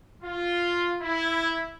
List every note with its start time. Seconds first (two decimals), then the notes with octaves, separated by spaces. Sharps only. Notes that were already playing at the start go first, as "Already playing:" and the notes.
0.23 F4
1.01 E4